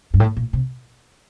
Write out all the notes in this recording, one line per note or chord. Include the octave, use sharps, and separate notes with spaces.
G2
A2
A#2
C3